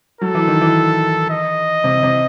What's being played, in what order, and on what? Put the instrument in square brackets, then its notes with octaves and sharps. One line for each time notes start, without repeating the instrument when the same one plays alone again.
[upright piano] F#3 [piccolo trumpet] A4
[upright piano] E3
D#3
E3
[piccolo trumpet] D#5
[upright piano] C3
C3